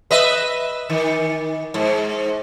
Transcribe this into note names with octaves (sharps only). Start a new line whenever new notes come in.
B4 D#5 E5
D#3
G#2